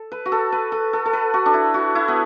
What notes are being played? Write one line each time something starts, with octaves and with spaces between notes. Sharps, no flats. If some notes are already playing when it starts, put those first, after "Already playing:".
Already playing: A4
B4
F#4
A4
B4
A4
A4
A4
B4
F#4
D4
E4
F#4
E4
B3